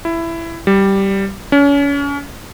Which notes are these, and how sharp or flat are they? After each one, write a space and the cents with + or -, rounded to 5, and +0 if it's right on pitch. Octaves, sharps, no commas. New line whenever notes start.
E4 +15
G3 -5
C#4 +35